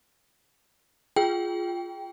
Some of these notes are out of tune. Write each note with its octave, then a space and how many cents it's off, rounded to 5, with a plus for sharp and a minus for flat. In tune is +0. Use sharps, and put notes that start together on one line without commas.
F4 +0 G#4 +0 G5 +0